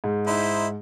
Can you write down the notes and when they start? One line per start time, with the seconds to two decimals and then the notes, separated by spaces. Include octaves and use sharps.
0.04 G#2
0.27 D#4 E4 C5